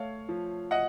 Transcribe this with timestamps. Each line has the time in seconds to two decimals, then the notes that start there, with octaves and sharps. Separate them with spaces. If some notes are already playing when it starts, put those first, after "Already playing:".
Already playing: A3 C#5 F5
0.29 F3
0.71 D#5 F#5